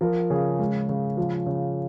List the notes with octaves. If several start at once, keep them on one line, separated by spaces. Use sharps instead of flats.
F3 A#4
C#3 G#4
G#3
C#3
F3
C#3